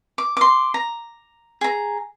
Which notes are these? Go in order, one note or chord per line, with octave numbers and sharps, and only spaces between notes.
D6
C6 D6
A#5
G#4 A#5